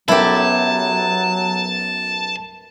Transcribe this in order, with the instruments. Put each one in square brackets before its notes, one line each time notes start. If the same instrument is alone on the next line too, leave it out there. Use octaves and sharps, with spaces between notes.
[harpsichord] B1 F#2 [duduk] F#3 [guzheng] E4 G4 [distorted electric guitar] A5